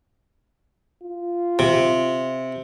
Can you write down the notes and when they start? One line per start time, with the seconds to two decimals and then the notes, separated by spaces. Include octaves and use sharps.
1.03 F4
1.59 C3